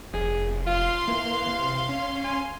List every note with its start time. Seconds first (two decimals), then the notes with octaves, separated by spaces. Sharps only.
0.14 F1 G#4
0.67 F4 F5 C6
1.08 E3 A#3
1.47 C3
1.89 C#4
2.24 G#5